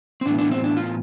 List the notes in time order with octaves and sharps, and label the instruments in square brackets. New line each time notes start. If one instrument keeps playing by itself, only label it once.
[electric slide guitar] C4
A2 E3 B3 D4
D4
C4
D4
F4